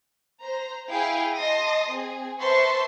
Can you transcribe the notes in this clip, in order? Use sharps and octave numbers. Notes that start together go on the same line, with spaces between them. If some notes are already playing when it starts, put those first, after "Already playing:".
C5 A#5
E4 G#4 F5 G5 G#5
D#5 A5 C6 D#6 A#6
C4 G#4
B4 C5 E5 A5 C6 C#6